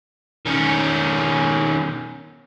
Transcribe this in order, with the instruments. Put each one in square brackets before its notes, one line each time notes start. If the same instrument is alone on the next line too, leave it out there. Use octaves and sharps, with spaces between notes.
[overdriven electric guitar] D#3 C#4